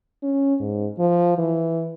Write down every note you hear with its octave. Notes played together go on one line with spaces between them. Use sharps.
C#4
G#2
F3
E3